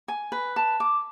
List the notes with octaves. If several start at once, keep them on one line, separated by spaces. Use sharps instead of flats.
G#5
B4
A5
D6